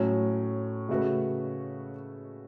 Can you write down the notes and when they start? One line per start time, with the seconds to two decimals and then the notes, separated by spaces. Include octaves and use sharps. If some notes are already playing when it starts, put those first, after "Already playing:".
Already playing: A2 F#3 C#4
0.89 C#3 A3 F#4 B4